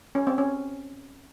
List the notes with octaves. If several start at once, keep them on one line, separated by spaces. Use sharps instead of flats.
C#4
C4
C#4